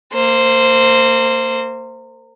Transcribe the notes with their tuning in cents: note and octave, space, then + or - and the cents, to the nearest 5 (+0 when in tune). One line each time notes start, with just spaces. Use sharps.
A#3 -30 C5 +0